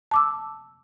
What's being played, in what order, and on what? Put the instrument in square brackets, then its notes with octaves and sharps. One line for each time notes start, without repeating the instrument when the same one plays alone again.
[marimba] A5 D6 E6